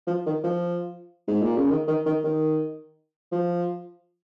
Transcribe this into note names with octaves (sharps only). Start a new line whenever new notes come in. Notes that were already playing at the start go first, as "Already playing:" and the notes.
F3
D#3
F3
G#2
A#2
C#3
D#3
D#3
D#3
D#3
F3